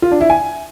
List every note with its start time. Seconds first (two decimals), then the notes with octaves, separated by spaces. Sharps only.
0.02 F4
0.11 D4
0.21 E4
0.30 G#5